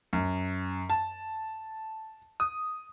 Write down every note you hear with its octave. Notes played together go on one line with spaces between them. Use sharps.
F#2
A5
D#6